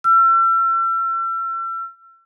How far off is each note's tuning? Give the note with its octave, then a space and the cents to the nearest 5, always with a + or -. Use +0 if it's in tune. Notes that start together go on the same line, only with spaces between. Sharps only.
E6 +40